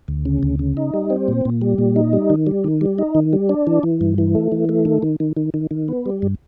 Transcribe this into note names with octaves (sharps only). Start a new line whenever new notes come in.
D2
C#3
D2
C#3
D#4
G3
C4
A#2
A#2
G3
A#2
D#4
G3
D#3
G3
D#3
G3
D#4
D#3
G3
D4
E3
E3
G2
E3
A3
E3
A3
D#3
D#3
D#3
D#3
D#3
D#3
B3
G3
G2